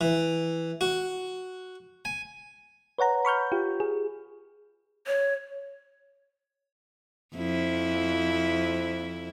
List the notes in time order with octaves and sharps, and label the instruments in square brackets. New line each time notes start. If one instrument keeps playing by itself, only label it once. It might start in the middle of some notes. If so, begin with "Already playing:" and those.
[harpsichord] E3
F#4
G#5
[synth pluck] B4 C#5 F#5 A#5
B5 C#6 F6 G6
F4 G4
G#4
[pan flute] C#5
[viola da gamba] F2 E4